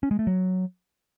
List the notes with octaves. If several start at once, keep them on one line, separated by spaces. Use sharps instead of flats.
C#4
G#3
A3
F#3